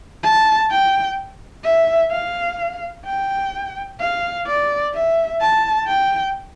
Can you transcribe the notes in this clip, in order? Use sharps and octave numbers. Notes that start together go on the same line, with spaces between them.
A5
G5
E5
F5
G5
F5
D5
E5
A5
G5